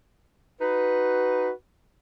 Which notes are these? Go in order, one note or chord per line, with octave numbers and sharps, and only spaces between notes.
D#4 F#4 B4